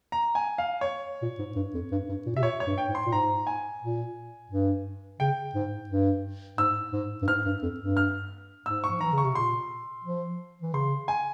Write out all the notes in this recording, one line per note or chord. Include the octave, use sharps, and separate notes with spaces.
A#5
G#5
F5
C#5
A#2
G#2
G2
F2
G2
G2
A#2
C3 E5
A#2 C#5
C#5
G2
G5
G#2
C6
A#2
G#2 A#5
G#5
A#2
G2
C#3 G5
G#2
G2
G#2 E6
G#2
G2
G#2 F6
G2
F2
G2
F6
G#2 E6
C#6
F3
E3 A#5
C#3
C#6
C3
A#2 C6
F3
E3
C#3 C6
G#5